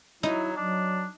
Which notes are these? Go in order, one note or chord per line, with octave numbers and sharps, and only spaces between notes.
F#3 D#4 E4
F#3 D4